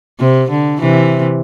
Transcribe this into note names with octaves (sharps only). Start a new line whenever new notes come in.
C3
D3
C3 E3